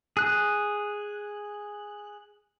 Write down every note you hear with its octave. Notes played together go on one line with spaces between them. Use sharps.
G#4 F#6